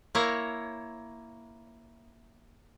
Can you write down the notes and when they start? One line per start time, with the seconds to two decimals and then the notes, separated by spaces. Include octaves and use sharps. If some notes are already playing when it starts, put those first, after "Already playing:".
0.15 A#3 E4 C#5 A#5